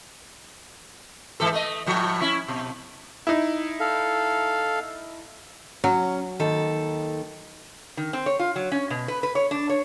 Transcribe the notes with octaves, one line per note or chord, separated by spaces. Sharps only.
G#2 E3 A4
A3 D#5
A2 F3
C#4 E4
B2
D#4 E4
A4 F5
F#3 C#4
D#2 D#3 A4
D#3
C4
C#5
F4
F#3
C#4
B2
B4
B4
C#5
D4
C#5